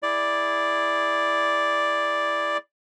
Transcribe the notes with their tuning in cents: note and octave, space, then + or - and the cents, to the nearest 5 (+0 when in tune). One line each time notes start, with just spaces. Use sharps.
E4 +0 G#4 -10 D5 +0